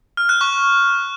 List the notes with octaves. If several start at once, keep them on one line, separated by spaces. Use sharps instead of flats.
F6
F#6
C#6